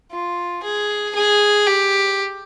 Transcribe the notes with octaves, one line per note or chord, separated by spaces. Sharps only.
F4
G#4
G#4
G4